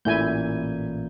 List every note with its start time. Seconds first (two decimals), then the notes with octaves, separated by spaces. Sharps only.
0.05 A1 A#2 A3 E4 G#5 G6